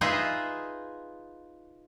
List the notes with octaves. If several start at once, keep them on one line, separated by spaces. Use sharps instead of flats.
D#4 F4 G#4 B4 D#5 E5